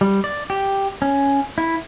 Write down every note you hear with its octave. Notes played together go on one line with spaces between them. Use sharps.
G3
D5
G4
C#4
E4